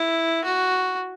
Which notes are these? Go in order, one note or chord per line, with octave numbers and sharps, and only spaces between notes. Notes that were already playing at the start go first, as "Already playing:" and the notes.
Already playing: E4
F#4